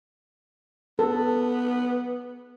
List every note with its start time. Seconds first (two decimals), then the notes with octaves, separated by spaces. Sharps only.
0.99 B3 A4